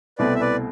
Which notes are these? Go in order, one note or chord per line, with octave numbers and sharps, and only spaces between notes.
C2 B2 A3 C4 E4 B4 D5
E5
B4 D5